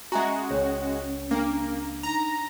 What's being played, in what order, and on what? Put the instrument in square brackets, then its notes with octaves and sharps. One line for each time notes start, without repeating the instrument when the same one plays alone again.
[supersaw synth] G#3 F#4 [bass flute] C#4 [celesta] E5 G#5 A#5
[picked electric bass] C#2 [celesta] C#5
[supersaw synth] A#3 [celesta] D4
[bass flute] D#4 [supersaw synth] A#5